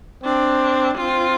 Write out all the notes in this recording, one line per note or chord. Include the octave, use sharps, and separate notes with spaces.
C4 D4
C4 F4